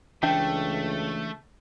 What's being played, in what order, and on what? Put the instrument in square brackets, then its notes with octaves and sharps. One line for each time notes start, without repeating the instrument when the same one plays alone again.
[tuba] C#2 [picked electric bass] E3 D4 [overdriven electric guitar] A3 [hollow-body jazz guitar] E5 G5